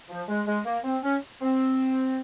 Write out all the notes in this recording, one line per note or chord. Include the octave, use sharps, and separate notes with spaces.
F3
G#3
G#3
A#3
C4
C#4
C4